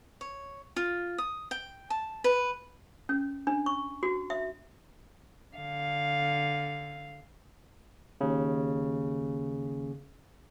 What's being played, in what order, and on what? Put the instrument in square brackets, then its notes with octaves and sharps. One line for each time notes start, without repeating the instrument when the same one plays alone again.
[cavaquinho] C#5
F4
D#6
G5
A5
B4
[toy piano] C#4
D4
C#6
F#4
E5
[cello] D3 F5
[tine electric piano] D#2 C#3